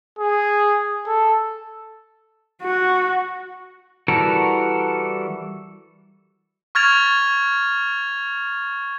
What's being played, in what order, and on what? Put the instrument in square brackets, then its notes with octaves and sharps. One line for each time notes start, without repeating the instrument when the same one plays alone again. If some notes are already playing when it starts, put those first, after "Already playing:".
[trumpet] G#4
A4
[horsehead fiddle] F#4
[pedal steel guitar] E3 G3 F#4 A4 A#4
[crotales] C#6 F6 G#6 A6 F7